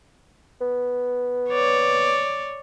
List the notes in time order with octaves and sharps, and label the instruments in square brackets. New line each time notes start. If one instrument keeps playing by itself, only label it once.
[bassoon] B3
[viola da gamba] C#5 D5